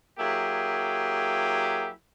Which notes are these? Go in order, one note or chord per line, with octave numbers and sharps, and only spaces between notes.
F#3 A#3 E4 G4 G#4